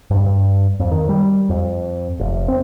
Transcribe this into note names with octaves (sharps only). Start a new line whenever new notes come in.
G2
F2
D#3
G3
F2
F1
C4